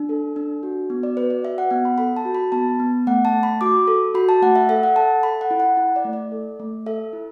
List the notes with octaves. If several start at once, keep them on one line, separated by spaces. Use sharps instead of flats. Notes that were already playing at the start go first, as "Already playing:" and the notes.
Already playing: D4
A4
D4
F#4
B3
D5
F#4 B4
D5
F#4 E5
F#5
B3 F#5
B5
A4 B5
A5
F#4
B5
B3 A5
B3
A3 F#5
A5
A3
B5
F#4 D6
A4
F#4 B5
A5
A3 F#5
E5
A4 E5
F#5
A4 A5
A4 B5
F#5
E4
F#5
E4
D5
A3
D5
A4
A3
A4 E5
E4